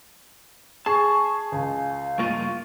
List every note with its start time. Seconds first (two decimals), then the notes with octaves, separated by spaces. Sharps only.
0.86 G#4 A5 C#6 C7
1.52 C#2 F5
2.19 G2 A#3 F4 C#6 D#7